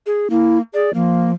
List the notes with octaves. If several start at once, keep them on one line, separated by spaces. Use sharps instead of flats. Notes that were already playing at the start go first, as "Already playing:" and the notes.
G#4
A#3 E4
G#4 D5
F3 A#3